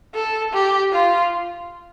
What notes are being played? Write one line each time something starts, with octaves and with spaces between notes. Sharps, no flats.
A4
G4
F4